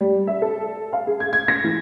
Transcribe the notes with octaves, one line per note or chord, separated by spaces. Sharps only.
G3
E5
A4
F5
G#4
G#6
G#6
A#6
E3